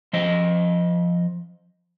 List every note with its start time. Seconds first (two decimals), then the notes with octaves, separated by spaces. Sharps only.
0.13 F3 C5 D#5